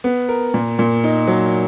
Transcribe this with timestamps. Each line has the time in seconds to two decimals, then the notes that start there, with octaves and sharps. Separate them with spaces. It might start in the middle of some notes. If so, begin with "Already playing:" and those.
0.04 B3
0.29 A#4
0.54 A#2
0.79 A#2
1.04 D#4
1.28 F#3